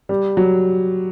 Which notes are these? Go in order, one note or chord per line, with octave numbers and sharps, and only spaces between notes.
G3
F#3